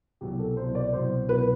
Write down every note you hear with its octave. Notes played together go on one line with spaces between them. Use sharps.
C2 B2 F#3 G4
A4
C2 B2 F#3 C5
D5
C2 B2 F#3 C5
C2 B2 F#3 B4